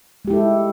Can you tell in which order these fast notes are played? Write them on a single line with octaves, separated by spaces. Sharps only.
G#3 G4 E4 A4